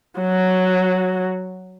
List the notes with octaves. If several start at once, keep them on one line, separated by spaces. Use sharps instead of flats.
F#3 F#4